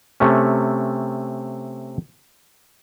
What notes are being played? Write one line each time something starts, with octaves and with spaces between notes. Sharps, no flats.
C3 A3 C#4